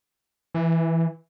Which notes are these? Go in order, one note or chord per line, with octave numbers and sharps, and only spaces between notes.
E3